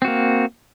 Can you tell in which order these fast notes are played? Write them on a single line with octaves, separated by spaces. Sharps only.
C4 F#4 A#3